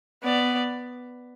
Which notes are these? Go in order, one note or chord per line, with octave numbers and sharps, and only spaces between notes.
B3 D5